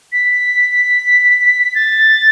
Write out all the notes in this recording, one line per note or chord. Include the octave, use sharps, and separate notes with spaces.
B6
A6